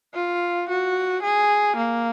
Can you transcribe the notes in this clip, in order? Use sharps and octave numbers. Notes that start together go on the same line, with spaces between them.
F4
F#4
G#4
A#3